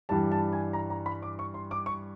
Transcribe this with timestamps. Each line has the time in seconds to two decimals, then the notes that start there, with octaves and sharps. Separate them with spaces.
0.09 G2 E3 G3 A5
0.32 A5
0.53 G#5
0.73 A#5
0.90 A#5
1.06 B5
1.22 D6
1.39 C#6
1.54 C6
1.71 D6
1.86 C#6